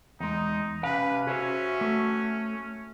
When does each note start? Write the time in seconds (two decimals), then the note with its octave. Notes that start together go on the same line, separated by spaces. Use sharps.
0.20 E2 G#3 D#4
0.83 C3 C#4 B4 F5
1.27 C#4 F#4 G#4 C5 C#5 E5
1.81 A3